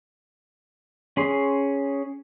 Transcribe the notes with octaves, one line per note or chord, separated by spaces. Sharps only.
C#4 G#4 C6